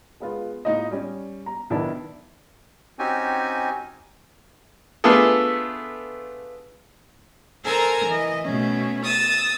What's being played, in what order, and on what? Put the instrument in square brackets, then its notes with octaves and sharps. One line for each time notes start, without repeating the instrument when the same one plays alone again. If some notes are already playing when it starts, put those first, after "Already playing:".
[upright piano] G#3 B3 F4
A2 D#4 F4 D#5
G3 C#4
A#5
B1 D#3 B3 D4 E4 A5
[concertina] C4 C#4 D#4 F#4 G4 G#5
[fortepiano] A3 B3 D4 F4 G#4 A4
[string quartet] A4 A#4 C5 G#5 A#5
E3 D#5
B2 A3 C#4
D#6 E6 A6